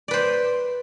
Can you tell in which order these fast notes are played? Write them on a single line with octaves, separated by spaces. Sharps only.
D5 B4 C5